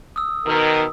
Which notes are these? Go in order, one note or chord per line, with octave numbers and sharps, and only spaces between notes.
D#6 E6
B2 D#3 A#4